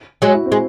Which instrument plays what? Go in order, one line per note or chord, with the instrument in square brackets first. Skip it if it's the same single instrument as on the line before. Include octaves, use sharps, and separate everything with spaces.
[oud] F#3 G#3
[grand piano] E4 F#4
C4
[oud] G#3